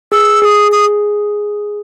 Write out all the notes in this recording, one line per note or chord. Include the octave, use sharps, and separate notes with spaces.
G#4 E6
G#4 D#6 E6
D#6